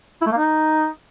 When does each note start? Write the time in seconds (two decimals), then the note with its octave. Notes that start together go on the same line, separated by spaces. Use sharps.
0.21 E4
0.26 A3
0.32 A#3
0.37 D#4